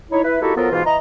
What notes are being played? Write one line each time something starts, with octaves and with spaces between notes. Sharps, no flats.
D#4 E4 C#5
E4 B4
A#3 D#4 E4 F#4 G4 A4
F3 F#3 B3 F4 A4 A#4
G#2 B2 E3 F4
E3 D#5 A#5